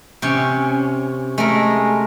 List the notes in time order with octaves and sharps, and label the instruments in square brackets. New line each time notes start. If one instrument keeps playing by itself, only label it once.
[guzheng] C3 C#4
[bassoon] G#3 [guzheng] A3 A#4